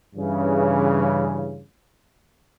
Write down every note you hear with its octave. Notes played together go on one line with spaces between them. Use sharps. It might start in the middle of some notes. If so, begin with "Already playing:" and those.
G2 C#3 E3